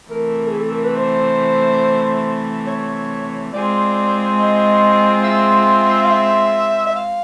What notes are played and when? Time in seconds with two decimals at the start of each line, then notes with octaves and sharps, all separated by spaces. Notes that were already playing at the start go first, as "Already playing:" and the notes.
0.10 C3 E3 A3 A#4
0.47 G#4
0.59 A4
0.71 A#4
0.84 B4
0.96 C5
2.67 C#5
3.53 G#3 C4 F4 G#4 D5
4.39 D#5
5.24 E5
6.05 F5
6.10 E5
6.87 E5
6.96 F5